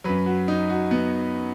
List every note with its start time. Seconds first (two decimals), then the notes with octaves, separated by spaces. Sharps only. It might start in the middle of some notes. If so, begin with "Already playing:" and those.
0.04 F#2 F#3 B4
0.26 F#4
0.48 D#4
0.69 F#4
0.91 B3